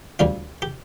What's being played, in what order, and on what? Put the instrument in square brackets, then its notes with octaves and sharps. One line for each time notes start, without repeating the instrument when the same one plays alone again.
[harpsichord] D2 D3 G3 F4
G4